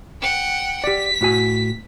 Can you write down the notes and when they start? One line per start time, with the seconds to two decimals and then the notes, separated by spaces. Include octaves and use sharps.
0.21 F#5 G5
0.84 G4 D5 B6
1.21 A2 F#4 G#5